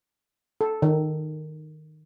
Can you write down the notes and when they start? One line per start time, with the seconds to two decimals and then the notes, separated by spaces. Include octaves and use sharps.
0.61 A4
0.82 D#3